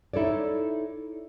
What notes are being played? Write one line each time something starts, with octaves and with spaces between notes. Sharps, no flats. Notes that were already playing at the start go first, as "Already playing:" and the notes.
D#4 E4 A4 C#5 D5